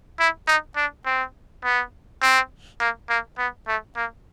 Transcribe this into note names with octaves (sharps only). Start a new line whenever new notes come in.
E4
D#4
D4
C4
B3
C4
A#3
A#3
B3
A3
A#3